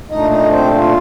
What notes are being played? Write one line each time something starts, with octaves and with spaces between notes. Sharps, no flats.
A#2 A3 D4 D#4 D#5
D#4 D#5
C4 C5
G4
F4